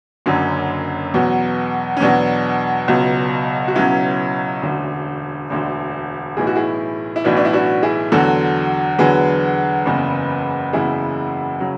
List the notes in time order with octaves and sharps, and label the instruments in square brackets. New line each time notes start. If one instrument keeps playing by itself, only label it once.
[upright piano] F#1 F#2 D3 F#3 C#4
E2 B2 F#3
C#4
E2 B2 F#3 D4
C#2 B2 F#3
F#4
C#2 B2 F#3 C#4 E4
E1 D2 D3
E1 D2 D3
B1 A2 E3 G#4
F#4
E4 G#4
E4
B1 A2 E3 D4 F#4
D4
E4
D4 F#4
E4 G#4
E2 D3 F#3 F#4 A4
E2 D3 F#3 G#4 B4
F#1 E2 C#3
F#1 E2 C#3 E4 G#4
C#3 F#3